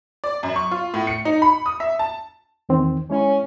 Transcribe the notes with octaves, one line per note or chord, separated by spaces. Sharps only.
D5
F#2
C#6
F4
A2
C#7
D#4
B5
D#6
E5
A5
E2 D#3 C4
G#3 C#4 E4 C#5